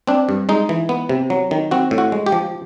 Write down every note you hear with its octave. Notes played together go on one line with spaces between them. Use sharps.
C4 D4
G2
G#3 D#4
E3
B3
C3
F#3
D#3
C4 F#4
A2
F#4
G#3
G4
F3